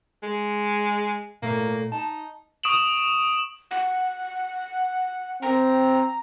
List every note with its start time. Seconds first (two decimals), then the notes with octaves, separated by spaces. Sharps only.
0.23 G#3
1.42 A#2 A3 A#3
1.92 D#4 A5
2.63 C#6 D#6 D7 E7 F#7
3.71 F#5
5.42 C4 A#5